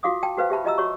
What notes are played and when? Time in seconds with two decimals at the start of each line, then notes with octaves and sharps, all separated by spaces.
0.03 F4 F#4 F5 D6 D#6
0.23 G5 A5
0.37 F#4 B4 C5 F5
0.50 G4 E5 A5 B5
0.65 F4 D#5 A#5 E6
0.78 F#4 C#5 C#6